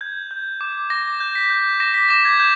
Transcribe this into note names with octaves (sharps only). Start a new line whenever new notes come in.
G6 G#6
G6
D6
D6 A#6
G6
B6
G6
D6 A#6
B6
D6 A#6
G#6
G6